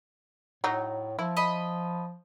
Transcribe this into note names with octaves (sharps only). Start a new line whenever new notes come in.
A2 F#3 D#4
F3 E4
D#5 B5